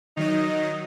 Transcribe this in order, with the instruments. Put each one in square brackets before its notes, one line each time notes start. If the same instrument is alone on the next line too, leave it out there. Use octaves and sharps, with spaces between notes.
[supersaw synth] D#3 F#3 D#5 [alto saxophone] D#4